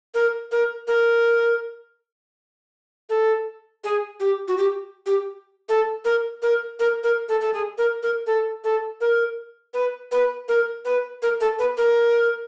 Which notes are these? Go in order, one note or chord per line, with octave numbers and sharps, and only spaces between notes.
A#4
A#4
A#4
A4
G#4
G4
F#4
G4
G4
A4
A#4
A#4
A#4
A#4
A4
A4
G#4
A#4
A#4
A4
A4
A#4
B4
B4
A#4
B4
A#4
A4
B4
A#4